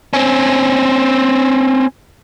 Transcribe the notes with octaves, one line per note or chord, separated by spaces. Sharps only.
C4 C#4